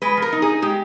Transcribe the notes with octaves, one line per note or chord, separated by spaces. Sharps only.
G#3 B4
F3
A#4
D#4
G#4
D#4
G#3 G4